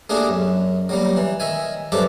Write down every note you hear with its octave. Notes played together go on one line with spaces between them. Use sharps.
A3 A#3 D4 G4 G#4
F#2
F#3 G3 A#3
E3
D#3 E5 G#5
G2 F3 F#3 A4 E5 D6